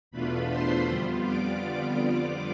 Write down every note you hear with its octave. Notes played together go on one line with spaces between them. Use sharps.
E2 B2 A3 D4 F4 B4 B5
C5 C6
F2 D3 G3 B3 F4
D5 D6